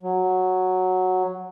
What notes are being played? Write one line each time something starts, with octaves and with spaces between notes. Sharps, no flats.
F#3